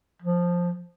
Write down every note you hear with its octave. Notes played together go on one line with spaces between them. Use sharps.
F3